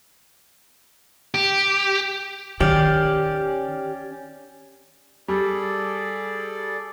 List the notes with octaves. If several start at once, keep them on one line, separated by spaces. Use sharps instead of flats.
G4
D#3 C#4 G4 D5 F5
G3 G#4 A4 D5